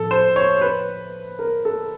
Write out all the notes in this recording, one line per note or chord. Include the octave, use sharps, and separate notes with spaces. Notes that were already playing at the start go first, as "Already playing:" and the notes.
Already playing: A2 F3 A4
C5
C#5
B4
A#4
A4